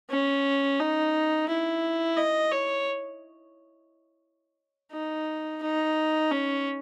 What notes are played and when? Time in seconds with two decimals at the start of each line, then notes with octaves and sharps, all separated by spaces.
0.11 C#4
0.80 D#4
1.49 E4
2.17 D#5
2.52 C#5
4.92 D#4
5.62 D#4
6.32 C#4